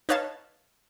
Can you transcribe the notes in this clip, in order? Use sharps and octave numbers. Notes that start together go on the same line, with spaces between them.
D#4 B4 C#5 F5 A5